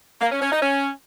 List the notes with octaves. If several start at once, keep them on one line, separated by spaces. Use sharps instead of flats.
A#3
C#4
C#4
D#4
C#4